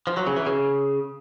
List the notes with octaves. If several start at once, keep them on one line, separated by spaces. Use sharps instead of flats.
F3
F#3
C#3
E3
C#3